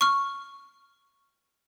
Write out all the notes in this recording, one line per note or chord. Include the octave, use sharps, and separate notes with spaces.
C#6 F6